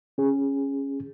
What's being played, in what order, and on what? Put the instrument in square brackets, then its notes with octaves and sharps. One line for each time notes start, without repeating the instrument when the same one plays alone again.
[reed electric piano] C#4 G#4